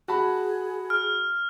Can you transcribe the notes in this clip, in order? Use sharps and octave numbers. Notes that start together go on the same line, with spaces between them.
F#4 G#4 A5 B5
F6